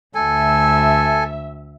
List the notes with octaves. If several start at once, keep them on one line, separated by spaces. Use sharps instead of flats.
D2 A4 E5 G#5